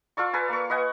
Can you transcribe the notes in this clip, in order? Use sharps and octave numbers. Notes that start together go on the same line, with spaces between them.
F4 A4 D5 C#6
A4 B4 G#5
A#3 C#6
B4 D#5 F#5 G#5